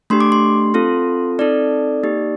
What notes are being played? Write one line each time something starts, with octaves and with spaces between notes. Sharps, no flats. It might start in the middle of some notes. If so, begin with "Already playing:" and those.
A3 D4 G4 C6
D6
C6
C4 F4 A4
C4 D#4 A4 D5
A#3 D#4 G4